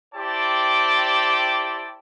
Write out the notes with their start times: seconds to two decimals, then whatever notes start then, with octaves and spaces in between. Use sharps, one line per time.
0.15 E4 G4 C5 D5 G5 A5